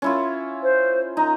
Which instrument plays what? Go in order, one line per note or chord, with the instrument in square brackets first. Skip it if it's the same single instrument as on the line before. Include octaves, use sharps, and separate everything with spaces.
[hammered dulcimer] C#4 E4 F4
[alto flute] C5
[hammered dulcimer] D#4 [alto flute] A#5